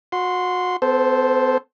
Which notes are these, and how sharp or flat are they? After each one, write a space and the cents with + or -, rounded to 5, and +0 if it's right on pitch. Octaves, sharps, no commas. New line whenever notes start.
F#4 -30 C6 -10
B3 +45 A4 -10 C5 +0